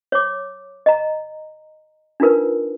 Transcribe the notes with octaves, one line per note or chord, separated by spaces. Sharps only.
C#5 D6
D#5 A#5
D4 D#4 F4 A#4 B4